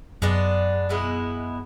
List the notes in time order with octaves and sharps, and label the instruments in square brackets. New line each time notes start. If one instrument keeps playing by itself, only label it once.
[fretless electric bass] F#2 [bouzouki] G#3 B3 D4
[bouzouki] B2 G#3 B3 E4